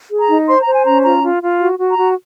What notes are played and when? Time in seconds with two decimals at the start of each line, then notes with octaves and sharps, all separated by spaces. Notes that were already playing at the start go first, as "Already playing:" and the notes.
0.10 G#4
0.18 A#5
0.29 D#4
0.48 C5 C6
0.60 A#5
0.66 C5
0.73 G#5
0.85 C#4 A#5
1.04 F4 A#5
1.22 F4
1.42 F4
1.60 F#4
1.80 F#4
1.89 A#5
1.98 F#4